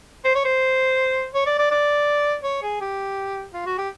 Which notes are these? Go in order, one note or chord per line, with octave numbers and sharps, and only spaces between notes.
C5
C#5
C5
C#5
D5
D5
D5
C#5
G#4
G4
F4
F#4
G4